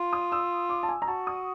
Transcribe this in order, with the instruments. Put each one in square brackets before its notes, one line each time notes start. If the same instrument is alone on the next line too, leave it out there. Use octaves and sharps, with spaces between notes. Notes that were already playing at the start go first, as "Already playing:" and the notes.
Already playing: [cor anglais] F4
[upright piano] D#6
E6
D6
A5
G#5
A#5
[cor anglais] F#4 [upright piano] A5
[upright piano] D#6